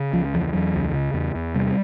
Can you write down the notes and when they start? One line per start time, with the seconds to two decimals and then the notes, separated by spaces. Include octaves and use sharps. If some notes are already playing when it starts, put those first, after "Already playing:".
Already playing: C#3
0.13 C#2 F3
0.34 E2 F3
0.53 E2 F#3
0.74 C#2
0.94 C#3
1.14 E2
1.35 E2
1.54 C3 G3